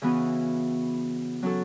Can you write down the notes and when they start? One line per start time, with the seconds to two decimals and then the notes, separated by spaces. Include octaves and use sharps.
0.02 C#3 E3 B3 F#4
1.43 F#3 C#4 F#4 A4